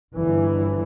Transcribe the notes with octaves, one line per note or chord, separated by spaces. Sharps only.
G1 E3